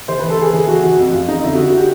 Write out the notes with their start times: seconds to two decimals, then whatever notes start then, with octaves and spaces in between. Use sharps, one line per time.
0.08 E3 C5
0.19 E3 B4
0.30 A4
0.39 E3 G#4
0.53 E3 G#4
0.68 E3 F#4
0.83 E3 F#4
0.99 F2
1.13 F2 F4
1.28 F2 D#4
1.43 D3 E4
1.54 F#4
1.58 D3
1.66 F#4
1.77 G4